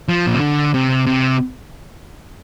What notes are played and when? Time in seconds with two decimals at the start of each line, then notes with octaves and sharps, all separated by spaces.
0.08 F3
0.27 A#2
0.34 C3
0.41 D3
0.74 C3
1.06 C3